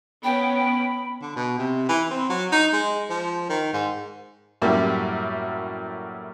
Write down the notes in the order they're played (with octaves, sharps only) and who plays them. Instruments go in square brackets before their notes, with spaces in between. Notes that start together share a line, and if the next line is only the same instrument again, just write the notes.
[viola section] B3 C#4 [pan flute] G5 [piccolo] B5
[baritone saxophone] D3
B2
C3
E3
C4
F#3
D#4
G#3
F3
D#3
G#2
[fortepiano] F#2 A2 G3 A#3 E4